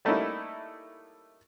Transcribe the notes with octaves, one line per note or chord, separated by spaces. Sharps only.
G3 A3 A#3 C#4 D#4 E4